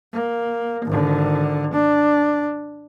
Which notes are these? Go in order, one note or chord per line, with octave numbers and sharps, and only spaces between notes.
A#3
G#1 D3
D4